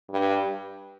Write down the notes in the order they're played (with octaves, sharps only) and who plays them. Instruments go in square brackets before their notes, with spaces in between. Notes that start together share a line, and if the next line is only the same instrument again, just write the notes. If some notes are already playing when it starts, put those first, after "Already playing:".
[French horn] G2